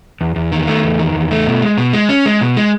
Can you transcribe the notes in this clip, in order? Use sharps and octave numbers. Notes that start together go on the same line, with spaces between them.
E2
E2
D#3
A3
E2
D#3
E2
A3
B2
G#3
B2
G#3
C#4
G#3
B2
G#3